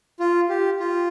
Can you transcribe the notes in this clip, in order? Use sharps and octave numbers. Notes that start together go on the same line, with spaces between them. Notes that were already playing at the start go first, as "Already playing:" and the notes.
F4
G4
F4